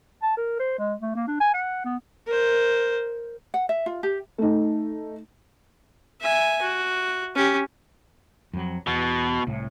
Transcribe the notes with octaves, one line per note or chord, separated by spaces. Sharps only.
A5
A#4
C5
G#3
A3
A#3
D4
G#5
F#5
B3
A#4 C5
F#5
E5
F4
G4
A3 D#4
E5 G#5
F#4
C#4 G4
F2 F#3
E2 B2
C2 A2